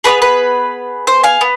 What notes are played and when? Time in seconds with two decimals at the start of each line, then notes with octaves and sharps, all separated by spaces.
0.04 B3 D4 G#4 B4
0.22 B4
1.07 C5
1.24 F5 G#5
1.41 B3